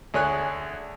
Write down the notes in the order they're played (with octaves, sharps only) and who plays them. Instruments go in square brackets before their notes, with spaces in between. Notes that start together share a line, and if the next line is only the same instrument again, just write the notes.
[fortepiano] D2 G#4 C#5 G#5 F#6